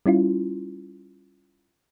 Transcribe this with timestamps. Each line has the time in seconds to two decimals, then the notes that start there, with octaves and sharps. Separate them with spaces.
0.06 G3 C#4 E4 F4